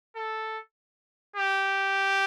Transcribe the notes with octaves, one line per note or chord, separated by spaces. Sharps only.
A4
G4